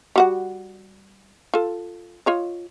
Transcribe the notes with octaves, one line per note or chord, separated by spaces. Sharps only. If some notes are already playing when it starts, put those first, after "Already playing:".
G3 F#4 F#5
F4 A4
F4 C#5 D#5